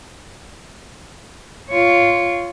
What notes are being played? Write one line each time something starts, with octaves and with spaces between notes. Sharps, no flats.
F4 C#5